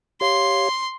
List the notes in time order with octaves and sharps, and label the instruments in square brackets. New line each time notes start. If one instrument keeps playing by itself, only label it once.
[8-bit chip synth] G4 C#5 F5 [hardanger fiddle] C6